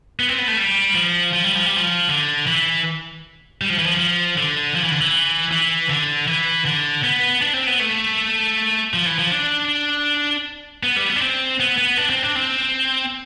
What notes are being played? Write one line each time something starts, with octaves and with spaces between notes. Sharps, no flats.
B3
C4
B3
A3
G3
F3
F3
G3
F3
G3
F3
D3
E3
G3
F3
E3
F3
F3
D3
F3
E3
D3
E3
E3
D3
E3
D3
B3
D4
C4
B3
A3
F3
E3
F3
D4
B3
G3
B3
D4
C4
B3
B3
D4
C4
D4
C4